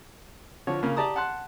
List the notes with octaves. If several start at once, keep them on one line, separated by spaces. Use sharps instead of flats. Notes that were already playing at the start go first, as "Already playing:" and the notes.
D3 F3 C#5
C#3 A#3
G4 D5 A5 A#5 D#6
F#5 A5 C6 F#6